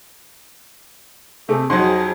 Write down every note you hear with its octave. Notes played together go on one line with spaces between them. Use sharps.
C3 A3 G#4
F2 F#3 D#4 F#5 C6